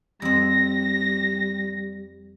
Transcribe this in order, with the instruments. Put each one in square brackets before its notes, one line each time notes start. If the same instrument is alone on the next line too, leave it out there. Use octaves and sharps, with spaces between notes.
[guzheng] F2 C4 [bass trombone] G3 [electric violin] A#6